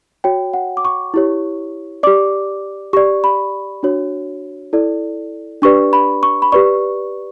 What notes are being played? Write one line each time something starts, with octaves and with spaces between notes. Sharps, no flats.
F#4 C#5 G5
F#5
D6
C#6
E4 G4 C#5
G4 D5 D6
G4 D5 C#6
B5
D4 F#4 C#5
E4 A4 D5
D4 G4 B4 D5 C#6
B5
C#6
B5
G4 B4 D5 C#6